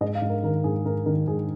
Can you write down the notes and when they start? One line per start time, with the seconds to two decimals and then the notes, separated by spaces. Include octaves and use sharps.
0.01 G#2 D#5
0.15 F5
0.22 G#2
0.29 A#4
0.43 D#3 A#4
0.64 G#2 G#4
0.85 G#2 A#4
1.06 D#3 A#4
1.27 G#2 G#4